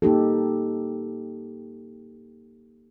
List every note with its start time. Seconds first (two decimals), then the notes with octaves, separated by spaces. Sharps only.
0.02 A#3 D#4 G4 A4